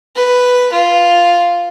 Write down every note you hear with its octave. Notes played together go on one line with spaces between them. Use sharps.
B4
F4